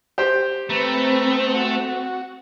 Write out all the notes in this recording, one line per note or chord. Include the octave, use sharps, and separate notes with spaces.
G4 C5 G5
A3 C4 B4 A#5
F#4